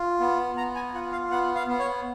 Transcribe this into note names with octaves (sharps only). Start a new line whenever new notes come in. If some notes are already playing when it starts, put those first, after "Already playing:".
Already playing: F4
B3
B3 A#5
G#5
F4 F#5
F5
B3 F#5
F5
B3
C#5